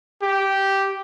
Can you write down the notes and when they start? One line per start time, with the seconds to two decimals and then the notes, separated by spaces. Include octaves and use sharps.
0.22 G4